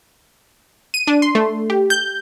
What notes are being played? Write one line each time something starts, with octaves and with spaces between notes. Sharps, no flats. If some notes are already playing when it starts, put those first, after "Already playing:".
D#7
D4
C6
A3
G4
G6